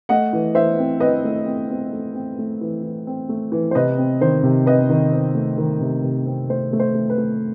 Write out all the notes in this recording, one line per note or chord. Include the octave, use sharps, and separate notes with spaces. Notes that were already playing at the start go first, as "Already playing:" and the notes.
A3 D#5 F#5
E3
E3 C5 E5
C4
C4 B4 D#5
A3
C4
C4
A3
C4
A3
E3
E3
C4
A3
E3
C5
C3 B4 D#5
C4
D#3 C5
C3
C4 B4 D#5
D#3
C4
A3
D#3
C3
C3
C4
A3 C5
A3
C5
A3
B4
A3